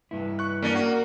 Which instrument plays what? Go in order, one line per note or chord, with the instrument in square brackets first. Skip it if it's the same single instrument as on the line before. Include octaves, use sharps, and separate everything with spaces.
[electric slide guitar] G2 E4 [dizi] B4
[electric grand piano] C#6 F#6
[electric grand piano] A#3 [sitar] C#4 D4 A#4
[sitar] F#4 [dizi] A#4